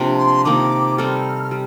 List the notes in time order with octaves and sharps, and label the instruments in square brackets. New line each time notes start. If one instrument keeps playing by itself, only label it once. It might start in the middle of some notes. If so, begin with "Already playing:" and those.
Already playing: [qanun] C3 F3 A#3 D4
[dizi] C6
[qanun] C3 D#3 A#3 [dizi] D6
[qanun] G3 C4 D#4 A4 [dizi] F6
[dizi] F6
[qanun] G3